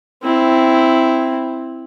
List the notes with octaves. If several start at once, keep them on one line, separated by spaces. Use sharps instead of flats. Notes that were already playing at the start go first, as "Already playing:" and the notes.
C4 E4